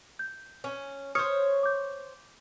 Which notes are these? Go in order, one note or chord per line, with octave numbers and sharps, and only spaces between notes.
G6
C#4
C5 C#5 D#6 F6 C#7
D6 G6